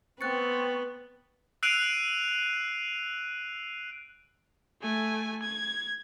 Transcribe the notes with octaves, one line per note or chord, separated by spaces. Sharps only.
B3 C4 C#6 F#6 A6 C#7
E6 F#6 C7 D7 D#7 F7
A3 G#5
G#6